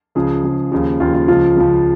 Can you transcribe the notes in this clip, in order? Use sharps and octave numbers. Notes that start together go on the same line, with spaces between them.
C#2 C#3 F3 G#4
C#2 C#3 F3
D#2 C#3 F3
D#2 C#3 F3 F4
F4
C#2 C#3 F3 F4
C#2 C#3 F3